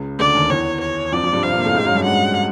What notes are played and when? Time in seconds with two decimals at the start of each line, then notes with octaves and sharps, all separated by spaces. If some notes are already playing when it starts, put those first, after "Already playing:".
Already playing: C#2 C#3
0.19 D2 D3 D5
0.35 D#2 D#3
0.50 E2 E3 C#5
0.82 C#5
1.12 F2 F3 D5
1.23 F2 F3
1.33 G2 G3
1.43 C3 C4 F5
1.54 A#2 A#3
1.65 A2 A3
1.74 G#2 G#3
1.85 F#2 F#3
1.95 G2 G3
2.05 G#2 G#3 F#5